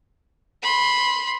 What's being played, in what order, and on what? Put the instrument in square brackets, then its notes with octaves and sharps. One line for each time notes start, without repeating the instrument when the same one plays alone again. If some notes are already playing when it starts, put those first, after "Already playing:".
[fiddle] B5 C6